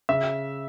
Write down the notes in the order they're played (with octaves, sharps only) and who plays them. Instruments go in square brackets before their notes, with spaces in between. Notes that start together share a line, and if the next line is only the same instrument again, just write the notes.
[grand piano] C#3 E5